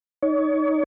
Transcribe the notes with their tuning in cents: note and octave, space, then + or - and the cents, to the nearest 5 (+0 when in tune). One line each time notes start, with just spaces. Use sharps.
D#4 +0 C#5 +35